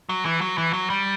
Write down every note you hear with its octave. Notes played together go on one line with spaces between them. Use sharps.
F#3
E3
F#3
E3
F#3
G3